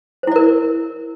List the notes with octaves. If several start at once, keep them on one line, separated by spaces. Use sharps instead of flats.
E4 A#4 C5 D5